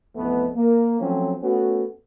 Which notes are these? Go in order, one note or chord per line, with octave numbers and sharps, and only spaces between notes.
A1 F2 A3 B3
A#3
F3 F#3 A3 C4 C#4
A3 B3 C#4 F#4